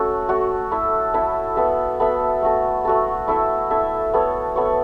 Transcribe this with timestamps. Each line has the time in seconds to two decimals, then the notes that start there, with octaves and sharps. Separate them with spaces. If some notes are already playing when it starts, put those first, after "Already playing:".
Already playing: A3 C#4 F#4 A4
0.29 A3 F#4 A4
0.71 E4 A4 E5
1.14 E4 A4 E5
1.56 B3 A4 E5
2.00 B3 A4 E5
2.42 A3 F#4 A4
2.85 A3 F#4 A4
3.28 E4 A4 E5
3.70 E4 A4 E5
4.14 B3 A4 C#5
4.56 B3 A4 C#5